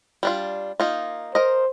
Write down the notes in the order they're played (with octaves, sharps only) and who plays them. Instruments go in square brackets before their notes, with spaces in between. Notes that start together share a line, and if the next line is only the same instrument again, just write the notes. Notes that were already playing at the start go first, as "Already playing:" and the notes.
[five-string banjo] G3 D4 F4
A#3 D#4 F4
[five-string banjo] A#4 D#5 [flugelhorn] C5